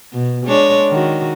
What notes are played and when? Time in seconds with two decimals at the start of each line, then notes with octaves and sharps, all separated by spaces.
0.13 B2
0.46 G#3 D4 C#5
0.89 D#3 F#4